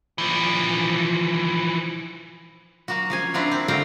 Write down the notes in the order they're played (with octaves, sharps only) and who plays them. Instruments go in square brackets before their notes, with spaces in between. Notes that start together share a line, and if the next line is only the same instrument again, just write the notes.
[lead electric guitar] E3 F3
[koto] F#3 A#3 F#4
F3 C#4 G#5
C4 D4 E4 F4 A#4 F#5
C4
D3 G3 A3 F5 G5 A#5